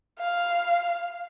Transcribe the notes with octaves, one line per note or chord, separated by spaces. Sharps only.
F5